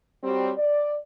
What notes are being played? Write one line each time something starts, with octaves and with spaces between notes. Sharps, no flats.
F#3 G3 C4
D5